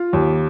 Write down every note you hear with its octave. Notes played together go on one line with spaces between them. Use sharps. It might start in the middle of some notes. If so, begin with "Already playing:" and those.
Already playing: F4
D#2